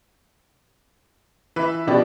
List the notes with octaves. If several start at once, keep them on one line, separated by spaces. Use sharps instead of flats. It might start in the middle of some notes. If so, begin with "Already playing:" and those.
E3 B4 E5
B2 F3 D4 G4